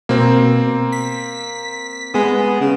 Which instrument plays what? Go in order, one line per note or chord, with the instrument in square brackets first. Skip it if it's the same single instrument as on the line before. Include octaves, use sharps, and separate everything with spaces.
[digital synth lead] B2 [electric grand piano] A#3 C4
[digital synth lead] B6
[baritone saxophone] G#3 [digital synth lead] B3
[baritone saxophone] C#3